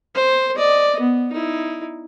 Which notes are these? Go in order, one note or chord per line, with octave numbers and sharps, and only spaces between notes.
C5
D5 D#5
B3
D#4 E4